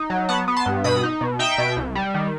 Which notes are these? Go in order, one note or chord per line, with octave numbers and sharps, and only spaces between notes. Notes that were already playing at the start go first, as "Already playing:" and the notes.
Already playing: D#4
F#3
B3 F#5 A5
B3
A5 C6
G2
B2 B5 D#6
D#4
B2
D#4 E5 G5
B2
C2
G3
D#3